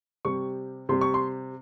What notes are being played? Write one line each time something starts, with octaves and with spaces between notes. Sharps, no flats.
C3 G3 C#6
C3 G3 C6
C#6
C6